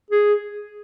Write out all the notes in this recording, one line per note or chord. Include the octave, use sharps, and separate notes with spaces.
G#4